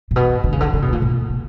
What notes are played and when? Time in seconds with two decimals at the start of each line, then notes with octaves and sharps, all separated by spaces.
0.11 A#2
0.16 B2
0.44 D3
0.52 C#3
0.60 D3
0.73 C#3
0.82 B2
0.92 A#2
1.02 B2
1.29 A#2